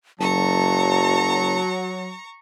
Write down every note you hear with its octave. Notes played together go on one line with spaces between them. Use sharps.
F#1 F#3 A5 A#5 C#6